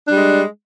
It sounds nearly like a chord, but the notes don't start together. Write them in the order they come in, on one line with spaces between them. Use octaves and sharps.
D4 G3 G#3